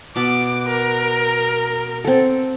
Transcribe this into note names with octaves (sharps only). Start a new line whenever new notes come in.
B2 A5 D6
A#4
C4 A4